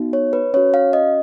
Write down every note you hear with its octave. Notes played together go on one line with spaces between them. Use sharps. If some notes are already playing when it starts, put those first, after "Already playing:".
Already playing: B3 D#4 F#4
C#5
B4
C#4 F#4 C#5
F5
D#5